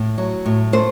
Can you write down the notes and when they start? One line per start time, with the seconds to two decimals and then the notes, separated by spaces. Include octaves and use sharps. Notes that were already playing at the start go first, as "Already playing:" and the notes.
Already playing: A2
0.18 F#3
0.46 A2
0.73 A3 C5